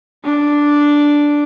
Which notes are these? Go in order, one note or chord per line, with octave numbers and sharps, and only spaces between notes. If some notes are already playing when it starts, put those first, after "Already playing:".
D4